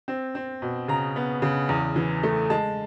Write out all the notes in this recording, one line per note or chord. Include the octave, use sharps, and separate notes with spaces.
C4
C4
B2
C#3 A#5
B3
C#3
E2
E3
A3
G#3 A5